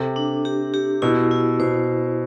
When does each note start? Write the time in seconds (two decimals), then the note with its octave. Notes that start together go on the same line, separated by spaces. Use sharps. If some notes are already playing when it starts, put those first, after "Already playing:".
Already playing: C3 A4
0.16 D4
0.45 G4
0.74 G4
1.02 B2 E4
1.31 E4
1.59 B2 C5